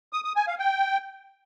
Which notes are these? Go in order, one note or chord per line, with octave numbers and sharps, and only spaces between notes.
D#6
D#6
G#5
F5
G5